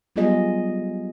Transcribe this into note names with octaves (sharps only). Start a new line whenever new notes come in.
F#3 G3 B3 F4 G#4 D#5